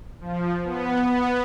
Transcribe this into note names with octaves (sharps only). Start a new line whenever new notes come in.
F3
B3
B3